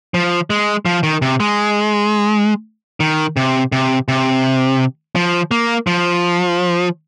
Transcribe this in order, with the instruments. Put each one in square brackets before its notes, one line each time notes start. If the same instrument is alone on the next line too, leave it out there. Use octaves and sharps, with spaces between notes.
[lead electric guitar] F3
G#3
F3
D#3
C3
G#3
D#3
C3
C3
C3
F3
A#3
F3